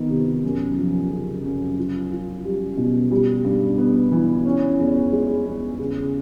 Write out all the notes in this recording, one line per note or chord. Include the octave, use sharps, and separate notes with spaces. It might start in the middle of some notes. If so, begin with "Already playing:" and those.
Already playing: D#3 B3
C3
F#2
F3
C#3
F#2
F4
F4
G3
B2
G3
G2
B3
E3
C#4
E2
G#3
E2
C#3